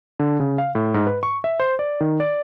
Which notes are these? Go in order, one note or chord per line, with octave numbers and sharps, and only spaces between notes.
D3
C#3
F5
A2
G#2
B4
C#6
E5
C5
D5
D#3
D5